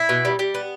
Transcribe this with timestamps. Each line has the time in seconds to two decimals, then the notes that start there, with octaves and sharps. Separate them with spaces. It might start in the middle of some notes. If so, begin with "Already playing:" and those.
Already playing: E4
0.09 B2
0.25 G3
0.39 G3
0.54 B3